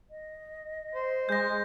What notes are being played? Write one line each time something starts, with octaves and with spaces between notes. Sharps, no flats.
D#5
C5
G#3 G6 A#6